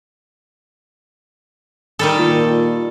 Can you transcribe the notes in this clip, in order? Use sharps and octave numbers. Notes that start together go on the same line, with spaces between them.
D#3 G3 A4
A#2